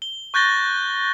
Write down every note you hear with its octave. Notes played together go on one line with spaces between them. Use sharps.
G7
C#6 F#6 G6 A6 A#6 G7